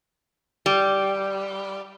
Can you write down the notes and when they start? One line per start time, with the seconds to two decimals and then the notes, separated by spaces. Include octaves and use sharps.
0.66 G3